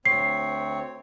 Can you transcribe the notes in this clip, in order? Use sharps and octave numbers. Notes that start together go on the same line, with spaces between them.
D2 C4 C#5 C7